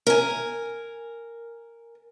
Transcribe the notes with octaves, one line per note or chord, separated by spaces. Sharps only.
A#4 G#5